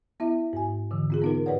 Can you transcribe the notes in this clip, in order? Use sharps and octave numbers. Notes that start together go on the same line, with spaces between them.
B3 E4 E5
G#2 G#5
G#2 D3 E3
C4 F4 G#4
B3 D#4 A#4
G#2 B4 C#5 D5 F#5